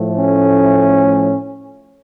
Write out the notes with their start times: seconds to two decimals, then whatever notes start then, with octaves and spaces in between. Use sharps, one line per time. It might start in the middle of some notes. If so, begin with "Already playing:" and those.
Already playing: A2 F3 A3
0.16 C#4